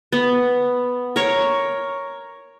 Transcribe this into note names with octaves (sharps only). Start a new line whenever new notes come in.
B3
A#4 C#5